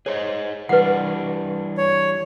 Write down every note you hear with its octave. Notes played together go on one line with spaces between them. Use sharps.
G#4 C5 C#5 D#5
E3 G3 D4 B4 F#5
C#5